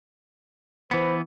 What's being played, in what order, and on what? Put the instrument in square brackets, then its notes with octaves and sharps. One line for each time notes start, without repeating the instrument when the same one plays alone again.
[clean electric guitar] E3 B3 [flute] C5